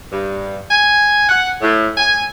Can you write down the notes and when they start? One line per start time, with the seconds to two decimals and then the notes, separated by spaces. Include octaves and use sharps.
0.12 G2
0.70 G#5
1.29 F#5
1.61 A2
1.97 G#5